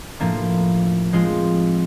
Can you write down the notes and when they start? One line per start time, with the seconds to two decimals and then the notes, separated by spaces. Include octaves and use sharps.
0.20 A2 F3 A#3 D4
1.12 F3 G#3 C4 F4